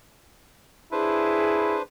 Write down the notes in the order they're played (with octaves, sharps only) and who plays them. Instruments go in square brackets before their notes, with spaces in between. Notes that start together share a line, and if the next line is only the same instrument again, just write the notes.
[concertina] D4 B4 C5 [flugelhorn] E4 [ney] G#4